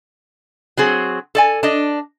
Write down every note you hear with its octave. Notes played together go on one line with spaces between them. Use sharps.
F#3 C4 G#4
A4 D5 G#5
D4 D#5